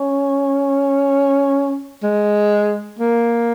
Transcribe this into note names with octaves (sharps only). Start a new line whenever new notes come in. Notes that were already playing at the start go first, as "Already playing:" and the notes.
Already playing: C#4
G#3
A#3